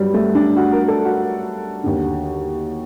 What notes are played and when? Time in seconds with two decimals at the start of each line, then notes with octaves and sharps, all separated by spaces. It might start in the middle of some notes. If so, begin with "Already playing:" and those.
Already playing: G2 D#3 F#3 G3
0.14 A3
0.35 D4
0.56 F#4
0.72 A#4
0.88 A4
1.05 F#4
1.83 D#2 D3